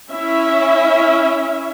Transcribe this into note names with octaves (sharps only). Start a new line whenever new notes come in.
C#4 E4 E5